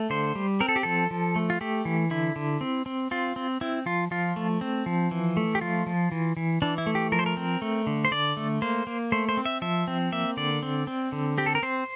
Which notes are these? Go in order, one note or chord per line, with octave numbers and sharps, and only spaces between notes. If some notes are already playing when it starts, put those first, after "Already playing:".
Already playing: A3
D3 C5
G3
C4 A#4
A4
G4
F3 A4
F3
A3
F4
A3 G4
E3
D3 E4
D3
C4
C4
C4 F4
C4
C4 E4
F3 F4
F3 F4
A3
C4
F3
E3
A3
G4
F3 F4
F3
E3
E3
E3 D4
E4
A3
G4
F3 A#4
C5
A#4
C4
A3
D3
C5
D3 D5
A3
A#3 C5
A#3
A3 C5
C5
C4
E5
F3 E5
C4
A#3 E5
D3 D5
C4
C4
D3
C4 G4
A4
A#4
C4 C5